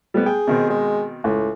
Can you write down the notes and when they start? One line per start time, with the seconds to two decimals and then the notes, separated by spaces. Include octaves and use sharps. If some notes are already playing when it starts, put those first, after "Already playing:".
0.14 F2 G3 B3
0.26 G#4 G5
0.47 B2 D#3 C4
0.70 G#3
1.24 C#2 A2